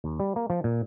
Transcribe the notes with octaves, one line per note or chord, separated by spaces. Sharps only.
D#2
G3
A#3
F3
A#2